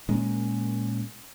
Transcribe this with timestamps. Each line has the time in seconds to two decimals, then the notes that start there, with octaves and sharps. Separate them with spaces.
0.08 A#2 G#3 A#3 C#4